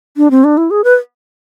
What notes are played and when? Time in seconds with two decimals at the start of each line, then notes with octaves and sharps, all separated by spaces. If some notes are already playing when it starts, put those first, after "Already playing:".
0.17 D4
0.31 C4
0.44 D4
0.57 E4
0.71 G#4
0.84 B4